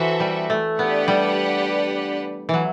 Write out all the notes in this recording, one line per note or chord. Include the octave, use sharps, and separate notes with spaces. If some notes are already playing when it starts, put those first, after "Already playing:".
Already playing: E3 C4 F#4 A4 E5
G3
A3
B3 D4 G4 B4 D5 F#5
G3
E3 F#3